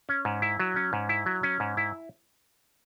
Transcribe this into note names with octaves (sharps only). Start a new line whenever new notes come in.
C#4
G#2
E4
F#3
C#4
G#2
E4
F#3
C#4
G#2
E4